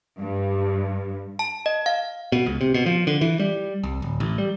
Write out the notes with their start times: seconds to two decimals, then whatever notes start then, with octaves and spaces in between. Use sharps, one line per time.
0.20 G2
1.39 A5
1.66 D#5
1.86 F5
2.32 B2
2.46 C#2
2.61 C3
2.74 B2
2.86 F3
3.07 D3
3.21 E3
3.40 G3
3.83 C2
4.02 D1
4.20 A1
4.38 G3